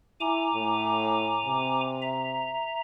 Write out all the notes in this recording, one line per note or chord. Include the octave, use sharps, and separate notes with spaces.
E4 G#5 A#5 D6
A2
C3
E5 A#5